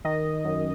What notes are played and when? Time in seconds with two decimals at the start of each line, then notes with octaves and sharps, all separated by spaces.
0.05 D#3 D#5
0.45 F#2